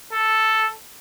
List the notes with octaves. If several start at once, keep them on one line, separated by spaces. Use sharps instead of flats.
A4